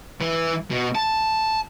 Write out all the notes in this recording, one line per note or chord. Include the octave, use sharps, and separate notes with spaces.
E3
B2
A5